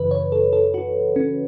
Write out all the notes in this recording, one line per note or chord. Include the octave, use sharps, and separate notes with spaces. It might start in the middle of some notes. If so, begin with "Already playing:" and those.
Already playing: F#2 C#3 E3 B4
C#5
A4
A4
F#4
C#4